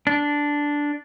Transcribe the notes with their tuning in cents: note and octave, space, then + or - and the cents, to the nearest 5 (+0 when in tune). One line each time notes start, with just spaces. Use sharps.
D4 -5